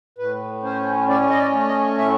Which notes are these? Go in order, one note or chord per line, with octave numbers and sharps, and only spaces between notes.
A2 B4
C#4 C5
C#4 D5
D#5
D5
A3
D#5
A2 E5